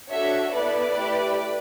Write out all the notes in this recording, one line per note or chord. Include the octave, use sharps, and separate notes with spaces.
D4 F#4 A4 C#5 E5
B3 E4 A4 B4 D5
A3 E4 G4